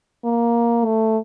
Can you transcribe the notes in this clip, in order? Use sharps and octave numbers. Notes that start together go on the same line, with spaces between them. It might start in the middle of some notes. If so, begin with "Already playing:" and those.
A#3
A3